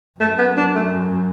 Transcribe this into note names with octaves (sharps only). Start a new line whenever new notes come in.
F#2 A3
B3
D4
A3